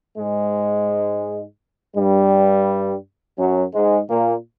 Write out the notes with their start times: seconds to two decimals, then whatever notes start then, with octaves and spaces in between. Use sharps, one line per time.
0.18 G#2 G#3
1.96 G2 G3
3.38 F#2 F#3
3.74 G#2 G#3
4.09 A#2 A#3